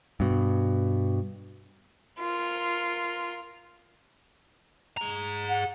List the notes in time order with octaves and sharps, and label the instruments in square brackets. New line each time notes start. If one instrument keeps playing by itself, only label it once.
[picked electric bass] G2 B2
[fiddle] F4 A#4
[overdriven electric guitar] G#4 A#5
[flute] F#5